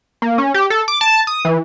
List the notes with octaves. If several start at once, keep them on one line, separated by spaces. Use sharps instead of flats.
A#3
C#4
G4
A4
D6
A5
D#6
E3